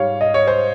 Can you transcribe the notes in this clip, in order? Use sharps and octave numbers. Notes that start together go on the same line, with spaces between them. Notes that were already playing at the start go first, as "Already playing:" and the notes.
Already playing: G#2 G3 C#5 F5
D#5
C#5
C5